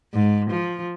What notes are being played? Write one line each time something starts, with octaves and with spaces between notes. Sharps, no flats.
G#2
F3